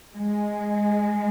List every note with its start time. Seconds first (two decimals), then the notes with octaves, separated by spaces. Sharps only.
0.16 G#3